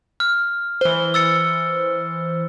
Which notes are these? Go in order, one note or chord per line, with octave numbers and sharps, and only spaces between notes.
F6
E3 C5 G7
E6 A6 C#7